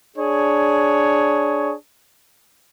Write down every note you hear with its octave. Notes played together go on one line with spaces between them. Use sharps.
D4 G#4 C#5